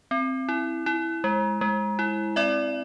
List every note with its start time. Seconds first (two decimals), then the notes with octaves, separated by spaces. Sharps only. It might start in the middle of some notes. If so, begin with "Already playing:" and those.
0.11 C4
0.49 E4
0.86 E4
1.24 G#3
1.61 G#3
1.99 E4
2.36 C4 D5 E5